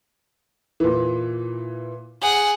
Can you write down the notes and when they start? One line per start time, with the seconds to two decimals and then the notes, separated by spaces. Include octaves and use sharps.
0.80 A#2 E3
2.22 G#4 F#5